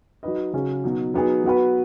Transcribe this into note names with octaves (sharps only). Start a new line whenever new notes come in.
F#3 D#4 B4 D#5
C#3 F#3 C#4
B2 F#3 D#4
F#3 B3 D#4 G#4
F#3 B3 F#4 B4